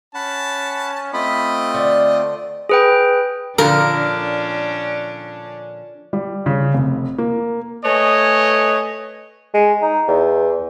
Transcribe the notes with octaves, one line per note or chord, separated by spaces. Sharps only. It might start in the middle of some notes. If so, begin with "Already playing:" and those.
C#4 F#5 A5 B5
A3 C4 F4 D#5 B5
D3 D5
G#4 B4 G5
A#2 D3 F3 C#4 D4 A#4
G3
C#3
F1
A#3
A3 B4 C#5 D#5 G#5
G#3
D#4
E2